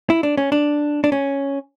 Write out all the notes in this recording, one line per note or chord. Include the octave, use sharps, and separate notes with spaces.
E4
D4
C#4
D4
D4
C#4